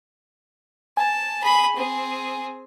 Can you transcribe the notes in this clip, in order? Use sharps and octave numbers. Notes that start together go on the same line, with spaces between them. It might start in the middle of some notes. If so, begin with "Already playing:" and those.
G#5 A5
G#4 B5
C4 G#4